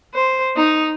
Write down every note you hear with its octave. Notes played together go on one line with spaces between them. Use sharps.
C5
D#4